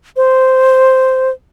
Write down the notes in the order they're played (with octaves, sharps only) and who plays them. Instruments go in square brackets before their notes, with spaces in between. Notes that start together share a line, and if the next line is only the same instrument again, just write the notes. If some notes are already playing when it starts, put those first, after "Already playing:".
[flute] C5